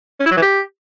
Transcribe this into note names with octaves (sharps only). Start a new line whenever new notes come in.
C#4
E4
F#3
E3
G4